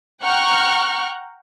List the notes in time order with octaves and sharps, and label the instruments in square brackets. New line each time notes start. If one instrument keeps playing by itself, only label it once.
[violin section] F#5 G5 A#5 C#6 F6 F#6